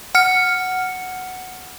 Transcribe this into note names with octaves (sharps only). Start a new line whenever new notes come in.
F#5 F6 C#7